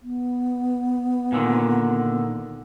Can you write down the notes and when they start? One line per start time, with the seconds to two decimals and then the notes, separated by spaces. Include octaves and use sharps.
0.02 B3
1.32 A#2 D3 D#3